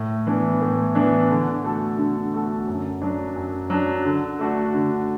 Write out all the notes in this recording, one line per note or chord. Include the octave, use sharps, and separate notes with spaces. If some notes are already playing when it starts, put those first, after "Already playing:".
Already playing: A2
E3 B3 D4
A2
E3 B3 D4
D3
A3 F#4 A4
D3
A3 F#4 A4
F#2
F#3 D4
F#2
F#3 D4
D3
A3 D4 F#4
D3